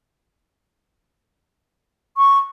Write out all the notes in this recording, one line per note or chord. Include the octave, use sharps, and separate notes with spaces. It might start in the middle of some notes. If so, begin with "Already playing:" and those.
C#6